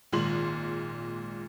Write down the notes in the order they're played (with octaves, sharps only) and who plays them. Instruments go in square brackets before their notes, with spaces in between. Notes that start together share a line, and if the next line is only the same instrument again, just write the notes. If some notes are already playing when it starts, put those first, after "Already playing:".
[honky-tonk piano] G#1 A#2 G#3 C6 F#7